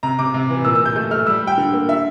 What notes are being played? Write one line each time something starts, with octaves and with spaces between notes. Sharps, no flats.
C3 A#5
C3 D6
C3
E3
A#2 E6
A#2 E6
G6
A3 G6
A3 F6
G3 E6
G3
G5
D3
A#3
D3 E5